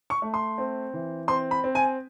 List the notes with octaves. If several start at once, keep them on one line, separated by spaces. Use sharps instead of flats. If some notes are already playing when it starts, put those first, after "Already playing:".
C#6
A3
C6
C4
E3
C4 C6
B5
C4
G#5